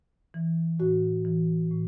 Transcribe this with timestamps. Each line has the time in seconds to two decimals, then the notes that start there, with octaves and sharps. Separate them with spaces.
0.34 E3
0.80 A2 F#4
1.25 E3
1.71 A2